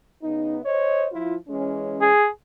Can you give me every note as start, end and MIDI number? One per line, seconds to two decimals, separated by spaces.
0.23 0.58 49
0.23 0.58 59
0.23 0.58 63
0.63 1.07 72
0.63 1.07 73
0.63 1.07 75
1.12 1.35 53
1.12 1.35 64
1.12 1.35 65
1.49 2.11 52
1.49 2.11 56
1.49 2.11 61
2.02 2.27 68